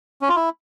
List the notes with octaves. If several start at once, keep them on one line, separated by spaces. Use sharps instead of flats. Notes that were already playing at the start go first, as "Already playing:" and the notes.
C#4
F4
E4